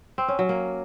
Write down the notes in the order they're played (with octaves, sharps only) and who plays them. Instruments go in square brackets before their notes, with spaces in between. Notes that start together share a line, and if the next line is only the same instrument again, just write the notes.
[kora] C4
C#4
F#3
A#3